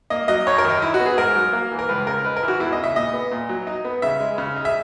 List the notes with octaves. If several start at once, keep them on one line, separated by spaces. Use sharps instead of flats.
A#3 D#5
F#3 D#5
F#2 C#5
A#4
D#3
D#4
D#4 E4
F#4
B3
G#4
G#2 A#4
F#3
A#3
E3
A#4
C#2 B4
C#3 A#4
G#3 B4
A#4
E3 E4
F#4
E2 E4
D#5
C#3
E5
A#2 D#5
B3
A#2
F#3
D#4
B3
C#3 E5
G#3
C#3
D#4
E5